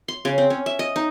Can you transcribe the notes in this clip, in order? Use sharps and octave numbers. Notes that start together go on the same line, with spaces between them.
C6
C#3
C4
C#4
E5
D#5
D#4